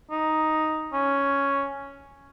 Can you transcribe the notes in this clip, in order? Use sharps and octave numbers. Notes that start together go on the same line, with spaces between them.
D#4
C#4